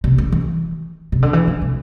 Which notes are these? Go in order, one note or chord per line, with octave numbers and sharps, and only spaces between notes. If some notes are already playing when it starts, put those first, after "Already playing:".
C3
E3
E3
C3
D3
E3
D3
C3